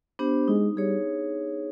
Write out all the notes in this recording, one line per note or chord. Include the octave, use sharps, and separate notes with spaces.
B3 D4 G4 C5
G#3 D#4
G3 G#4 C#5